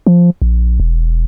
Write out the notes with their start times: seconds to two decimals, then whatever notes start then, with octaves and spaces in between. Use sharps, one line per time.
0.07 F3
0.42 A#1
0.80 E1